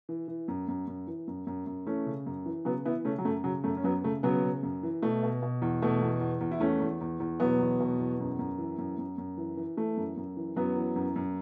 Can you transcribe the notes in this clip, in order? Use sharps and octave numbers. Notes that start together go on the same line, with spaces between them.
E3
E3
F#2
F#2
F#2
E3
F#2
F#2
F#2
E3 A3 C#4
C#3
F#2
E3
C#3 F#3 B3
E3 B3 E4
C#3 A3 C#4
F#3
F#2 A3
C#3 F#3
F#2 A3
C#4
F#2 F#3 B3
C#3 A3
C#3 F#3 B3
C#3
F#2
E3
B2 A3
B2
B2
E2
B2 A3
E2
E2
E2
E4
E2 A3 C#4
E2
E2
E2
B2 F#3 B3
E2
B2
E2
F#2
F#2
E3
F#2
F#2
F#2
E3
E3
E3 A3
F#2
F#2
E3
F#2 F#3 B3
E3
F#2
F#2